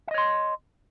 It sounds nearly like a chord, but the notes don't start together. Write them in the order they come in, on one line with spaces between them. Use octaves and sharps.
E5 D#5 C#5 C6